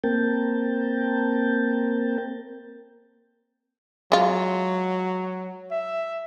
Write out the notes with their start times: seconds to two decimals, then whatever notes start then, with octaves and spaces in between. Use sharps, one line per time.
0.04 A#3 C4 A#4 G5 A5
4.12 F#3 G#3 F4
5.71 E5